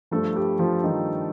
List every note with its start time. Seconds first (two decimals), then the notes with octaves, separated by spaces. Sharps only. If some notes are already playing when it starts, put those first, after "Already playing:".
0.11 G2 F3 A3 A4
0.35 G3 G4
0.59 F3 F4
0.84 G2 D#3 F3 D#4